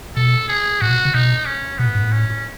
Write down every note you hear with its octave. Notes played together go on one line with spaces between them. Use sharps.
B2 A4
G#4
A2 F#4
B2
C#3
B2 D#4
C#4
B2 B3
A2
G#2
A2
C#4